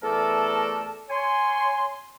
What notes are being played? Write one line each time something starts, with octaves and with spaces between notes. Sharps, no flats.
E2 A3 A4 A#4 D5 A5
C#5 G#5 C6